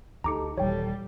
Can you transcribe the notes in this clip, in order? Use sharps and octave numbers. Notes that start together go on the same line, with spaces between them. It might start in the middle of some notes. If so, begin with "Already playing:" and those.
D2 D#4 G4 A4 A#5 D6 C#7
D#1 E3 G3 G4 A4 C#5 G5